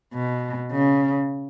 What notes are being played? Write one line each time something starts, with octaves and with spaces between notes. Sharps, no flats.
B2
C#3